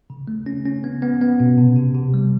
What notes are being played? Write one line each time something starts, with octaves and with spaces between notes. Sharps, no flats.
C#3
A3
C#4
C#4
B3
B3
B3
B2
C3
C3
C3
G3